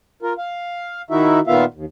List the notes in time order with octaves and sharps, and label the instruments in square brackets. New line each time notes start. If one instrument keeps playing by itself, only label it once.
[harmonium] F4 A#4
F5
D#3 D#4 E4 F#4 E5
A#2 D#3 B3 F4 E5 F5
D#2